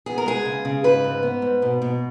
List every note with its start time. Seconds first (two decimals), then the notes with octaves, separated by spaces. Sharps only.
0.06 B3 G#4
0.18 A#4
0.26 G#3 G#4
0.45 C#3
0.65 C#3
0.84 G#2 B4
1.04 G#2
1.23 B3
1.42 G#2
1.62 B2
1.82 B2